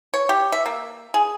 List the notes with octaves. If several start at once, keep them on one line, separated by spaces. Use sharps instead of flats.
C#5
G4
E5
A#3
G#4